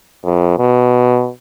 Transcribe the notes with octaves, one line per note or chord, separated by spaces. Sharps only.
F2
B2